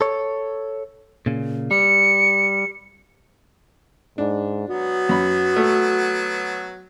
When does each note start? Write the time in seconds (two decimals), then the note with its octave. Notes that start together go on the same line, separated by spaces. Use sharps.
0.01 A4 C#5
1.26 A#2 C#3
1.71 G3 C#7
4.18 G#2 D4
4.69 F#3 B3 F#4
5.09 F#2 B5
5.56 A3